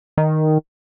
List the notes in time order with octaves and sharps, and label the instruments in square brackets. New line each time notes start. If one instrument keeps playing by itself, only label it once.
[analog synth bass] D#3